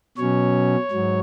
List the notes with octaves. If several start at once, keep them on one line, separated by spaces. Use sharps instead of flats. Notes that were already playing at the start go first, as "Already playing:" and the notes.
B2 F#3 C#4 C#5
G#2 F#3